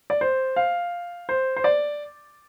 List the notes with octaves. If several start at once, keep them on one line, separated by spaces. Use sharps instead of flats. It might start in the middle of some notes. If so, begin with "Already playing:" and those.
D5
C5
F5
C5
C5
D5